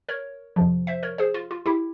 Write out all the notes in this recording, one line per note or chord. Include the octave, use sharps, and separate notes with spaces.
A#4 C#5
F2 C3 F3
C5 E5
A#4 C#5
G#4 C5
F4
F4
E4 G4